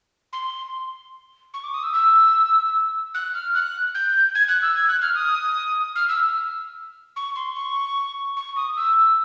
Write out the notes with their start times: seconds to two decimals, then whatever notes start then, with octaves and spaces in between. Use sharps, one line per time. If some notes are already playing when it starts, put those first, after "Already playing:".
0.33 C6
1.54 C#6
1.64 D6
1.74 D#6
1.83 E6
1.94 E6
3.14 F#6
3.34 F6
3.54 F#6
3.95 G6
4.35 G#6
4.48 F#6
4.62 E6
4.75 G#6
4.88 F#6
5.02 F6
5.15 D#6
5.95 F6
6.08 E6
7.16 C#6
7.36 C6
7.56 C#6
8.37 C#6
8.56 D#6
8.76 E6